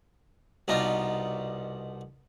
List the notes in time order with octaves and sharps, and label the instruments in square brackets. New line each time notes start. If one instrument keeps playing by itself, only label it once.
[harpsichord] C2 B2 D4 D#4 F4 A#5